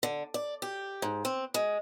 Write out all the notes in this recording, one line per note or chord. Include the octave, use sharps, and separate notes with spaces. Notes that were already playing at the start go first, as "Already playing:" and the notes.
D3
D5
G4
G#2
C4
G#3